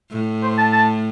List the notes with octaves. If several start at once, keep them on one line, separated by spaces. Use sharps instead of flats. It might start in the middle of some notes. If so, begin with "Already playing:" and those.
A2
C5
A5
A5